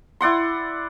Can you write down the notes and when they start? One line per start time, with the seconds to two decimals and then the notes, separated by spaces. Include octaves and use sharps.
0.21 E4 D5 F#5 C6